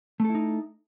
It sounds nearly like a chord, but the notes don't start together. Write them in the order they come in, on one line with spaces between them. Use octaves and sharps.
A3 A4 E4 D#4